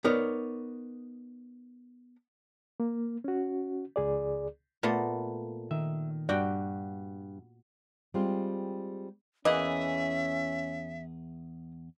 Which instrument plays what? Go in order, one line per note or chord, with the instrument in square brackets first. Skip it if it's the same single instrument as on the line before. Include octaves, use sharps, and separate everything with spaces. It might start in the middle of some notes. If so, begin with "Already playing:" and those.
[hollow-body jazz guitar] B3 D#4 A#4 C#5 D5
[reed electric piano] A#3
C#4 F#4
C#2 G#4 D5
[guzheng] A#2 A3 B3
[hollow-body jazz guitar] D#3 [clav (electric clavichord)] E5
[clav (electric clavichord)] G2 [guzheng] F#4 G5 [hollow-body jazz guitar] D5
[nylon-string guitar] G3 G#3 C4 F4
[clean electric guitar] E2 G#4 [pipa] E3 A#3 D#5 [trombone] C#4 [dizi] E5